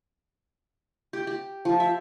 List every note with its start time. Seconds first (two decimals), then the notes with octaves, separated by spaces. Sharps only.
1.13 G4
1.27 G4
1.65 F3
1.80 E5